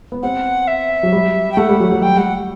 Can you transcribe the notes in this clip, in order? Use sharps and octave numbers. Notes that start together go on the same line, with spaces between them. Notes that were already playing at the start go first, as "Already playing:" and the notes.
B3
C4 F#5
E5
F#3
G3
G5
A3 F#5
G3
F#3
F#3
G3 G5
G3 F#5